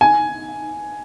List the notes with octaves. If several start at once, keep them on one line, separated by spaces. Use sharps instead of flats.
G#5